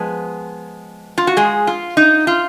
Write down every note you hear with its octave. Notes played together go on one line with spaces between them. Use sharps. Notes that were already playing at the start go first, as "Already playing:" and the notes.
Already playing: F3 G#3 B3
F4
F#4
G#3 G#4
F4
D#4
F4